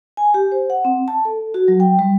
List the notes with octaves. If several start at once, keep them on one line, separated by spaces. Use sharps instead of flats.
G#5
G4
C5
F#5
C4
A5
A4
F#4
F#3
G5
G3